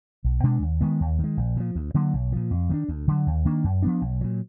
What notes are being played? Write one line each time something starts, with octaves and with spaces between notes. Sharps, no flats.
B1
B2 G#3 D4
D#2
D#3 G#3 B3
D#2
D#3 G#3
A#1
A#2 F3
D2
D3 F#3 A#3
B1
A#2 F3
F2
D#3 A#3 D4
D2
D3 F#3
D#2
D#3 A#3 D4
F#2
F3 B3 D4
B1
A#2 F#3